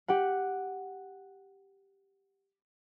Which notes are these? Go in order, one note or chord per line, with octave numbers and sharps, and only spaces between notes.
G4 F#5